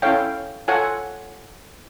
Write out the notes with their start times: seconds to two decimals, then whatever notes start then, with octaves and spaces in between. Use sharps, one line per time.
0.02 C#4 E4 A4 C#5 F5 G5
0.68 F4 A4 C#5 F#5 G#5